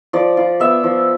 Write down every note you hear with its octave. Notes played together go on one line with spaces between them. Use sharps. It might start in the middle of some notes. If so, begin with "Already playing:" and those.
F3 D5
F4
B3 E5
F3